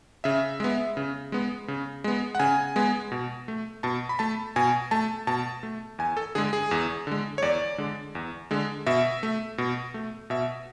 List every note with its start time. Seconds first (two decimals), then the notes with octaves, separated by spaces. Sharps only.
0.24 C#3 E5
0.60 G#3 B3
0.97 C#3
1.32 G#3 B3
1.68 C#3
2.04 G#3 B3
2.35 F#5
2.39 C#3 G#5
2.76 G#3 B3
3.12 B2
3.48 A3
3.83 B2 A5
4.09 B5
4.19 A3 A5
4.56 B2 G#5
4.91 A3 A5
5.27 B2 A5
5.63 A3
5.99 E2 G#5
6.17 A4
6.35 D3 G#3 G#4
6.53 G#4
6.71 E2
7.07 D3 G#3
7.38 C#5
7.42 E2 D5
7.78 D3 G#3
8.15 E2
8.51 D3 G#3
8.87 B2 E5
9.23 A3
9.58 B2
9.94 A3
10.30 B2 E5